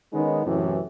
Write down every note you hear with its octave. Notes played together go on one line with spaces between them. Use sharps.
D#3 G#3 B3 C#4 D#4
F#2 A2 C3 E3